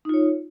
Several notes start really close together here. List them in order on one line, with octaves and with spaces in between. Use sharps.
D#4 F4 C#5